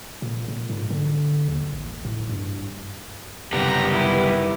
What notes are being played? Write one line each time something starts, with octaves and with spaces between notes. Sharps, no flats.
A#2
A#2
G#2
D3
D#2
A1
A2
G2
F#1 C3 D#3 G3 B3 G4 A#5
E4 B4